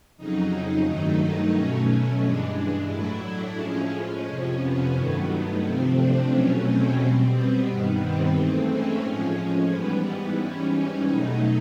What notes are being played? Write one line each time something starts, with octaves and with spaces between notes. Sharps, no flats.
F2 C#3 F#3 D#4
G2 D#3 F#3 A3
D#4
B2 F#3 A3 C#4
G2 E3 G#3 D4
A2 F#3 A3 E4
D4
A2 F3 G#3 C#4
C#4
F2 C3 F3 C#4
B3
G2 D#3 F#3 A3
C3 F3 A3 C4
D4
E2 B2 F#3 A3 C#4
C4
B2 G3
B3
G2 D#3 G3 B3
C4
G#2 E3 A3 C4
C#4
A2 F3 G#3 C#4
C#4
G#2 E3 G3 B3
G#2 E3 G3 C#4
C#4
E2 B2 F#3 A3 D#4